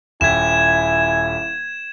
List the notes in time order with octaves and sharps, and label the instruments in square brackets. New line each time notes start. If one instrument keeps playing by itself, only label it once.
[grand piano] D#1 E5 G5 [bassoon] E4 [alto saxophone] G#5 [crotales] G#6 E7